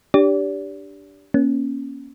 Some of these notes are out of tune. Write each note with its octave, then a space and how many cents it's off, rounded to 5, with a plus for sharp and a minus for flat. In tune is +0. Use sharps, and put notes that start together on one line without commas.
D4 +0 G4 +0 D5 -40
A#3 +35 C#4 +0